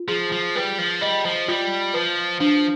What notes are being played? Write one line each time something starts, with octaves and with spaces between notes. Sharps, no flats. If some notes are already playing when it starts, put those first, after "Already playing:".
Already playing: F4
F3 G#4
F3
G3 B4
F3
G3 D#5
F3
G3 F4
F3 B4
F3 D4